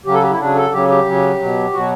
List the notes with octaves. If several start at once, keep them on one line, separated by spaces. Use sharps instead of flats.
C#3 F#3 G4
A4
G4
E4
C#3 F#3 D4
A4
C#3 F#3 G4
G4
C#3 F#3
B2 F#3
B2 F#3 F#4